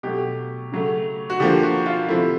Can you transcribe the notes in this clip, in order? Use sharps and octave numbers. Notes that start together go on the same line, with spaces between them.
B2 F#3 A3 G4
C#3 F#3 A3
F#4
D3 F3 A#3 G4
F#4
F4
C3 F3 A3 E4